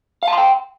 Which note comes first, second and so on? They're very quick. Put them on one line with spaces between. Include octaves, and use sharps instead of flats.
F5 A5 C6 G5